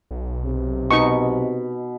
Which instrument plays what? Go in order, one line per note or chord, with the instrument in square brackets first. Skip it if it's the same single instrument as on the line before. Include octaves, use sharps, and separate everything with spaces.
[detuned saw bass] B1
[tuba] C3
[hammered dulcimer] B2 [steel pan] D#4 C#6